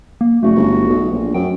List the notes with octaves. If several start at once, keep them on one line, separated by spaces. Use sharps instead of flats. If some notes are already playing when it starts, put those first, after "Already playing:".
A#3
F#1 A3 F#4
G1
B1
A#1
F#2 G5